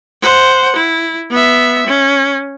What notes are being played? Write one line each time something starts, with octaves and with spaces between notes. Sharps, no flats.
C5 F#5
E4
B3 E5
C#4